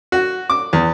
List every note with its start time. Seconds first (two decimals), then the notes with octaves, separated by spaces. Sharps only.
0.12 F#4
0.50 D6
0.73 E2